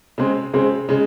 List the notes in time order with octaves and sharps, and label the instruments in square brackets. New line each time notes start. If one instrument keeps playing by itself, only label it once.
[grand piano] C#3 G#3 C4
C#3 G#3 C4
C#3 G#3